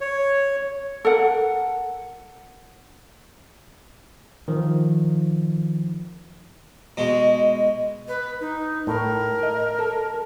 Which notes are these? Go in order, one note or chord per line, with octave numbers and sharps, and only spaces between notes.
C#5
A4 A#4 F#5
D#3 F3
B2 G#3
B4
D#4
A2 A#4
D#5
A4